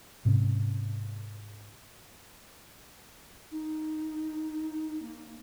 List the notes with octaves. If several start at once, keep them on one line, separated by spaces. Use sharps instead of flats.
G#2 C3 C#4
D#4
A#3